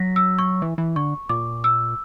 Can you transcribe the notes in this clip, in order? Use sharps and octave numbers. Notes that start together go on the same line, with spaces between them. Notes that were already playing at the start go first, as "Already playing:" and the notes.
Already playing: F#3 A#6 B6
E6
C#6
E3
E3
D3 C#6
A#2 D6
E6